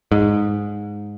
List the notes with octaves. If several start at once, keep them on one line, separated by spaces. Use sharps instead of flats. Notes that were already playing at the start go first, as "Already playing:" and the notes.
G#2